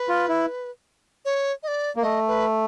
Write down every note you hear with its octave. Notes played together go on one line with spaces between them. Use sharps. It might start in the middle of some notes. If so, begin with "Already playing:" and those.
Already playing: B4
F4
E4
C#5
D#5
D5
A#3
A3 D#5
B4